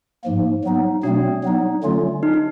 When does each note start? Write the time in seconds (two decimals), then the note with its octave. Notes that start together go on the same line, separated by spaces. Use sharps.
0.24 G#2 F3 A#3
0.64 F#3 B3 D#4
1.03 B2 F#3 A3 C4 D4
1.44 F#3 B3 D#4
1.83 D3 F#3 A3 C#4 F4
2.23 D#4
2.34 D#4